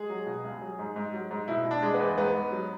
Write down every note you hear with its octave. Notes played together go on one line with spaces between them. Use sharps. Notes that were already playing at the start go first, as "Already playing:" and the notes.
Already playing: G#3 G#4
F#3
B2
C#2
F#3
G#2
G#2
F#3
G#2
B2 E4
B2
D4
G#3
B3
E2
G#2 B3
G#2
F#3